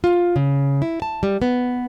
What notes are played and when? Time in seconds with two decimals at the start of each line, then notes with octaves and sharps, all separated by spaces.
0.04 F4
0.36 C#3
0.82 E4
1.02 A5
1.23 G3
1.42 B3